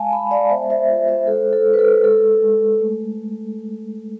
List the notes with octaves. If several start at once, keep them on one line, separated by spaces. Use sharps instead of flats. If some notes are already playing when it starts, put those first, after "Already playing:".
Already playing: G#3 F5 G#5 A5
G#3 G#5 B5
D5 F5
B3 C5 E5
C5 E5
F4
C5 E5
G#3 A4 C5
A4
G#3
B4
A4
G#3 A4
G#3
A3